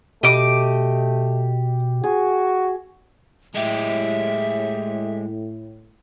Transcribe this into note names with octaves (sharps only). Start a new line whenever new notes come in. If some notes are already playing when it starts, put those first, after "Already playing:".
B2 A3 G4 D#5 D6
F#4 G#4
A2 G#3 G4 E5